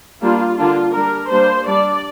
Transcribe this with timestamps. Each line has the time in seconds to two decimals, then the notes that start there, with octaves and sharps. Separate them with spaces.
0.22 G3 A#3 D4 F4
0.57 D3 A#3 D4 F4
0.93 G3 D4 A#4
1.30 G3 A#3 D4 C5
1.67 G3 D4 D5